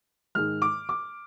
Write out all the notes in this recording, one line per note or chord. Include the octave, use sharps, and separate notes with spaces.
G#2 D#3 G#3 F6
D6
D6